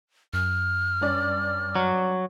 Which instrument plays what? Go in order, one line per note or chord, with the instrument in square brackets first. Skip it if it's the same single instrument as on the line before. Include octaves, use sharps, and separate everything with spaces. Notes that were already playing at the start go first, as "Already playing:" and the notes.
[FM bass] F#2 [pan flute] F6
[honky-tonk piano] G2 C#4 D5
[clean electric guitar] F#3